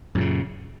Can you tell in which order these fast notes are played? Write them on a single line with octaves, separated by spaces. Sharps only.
F#2 A#2 C#3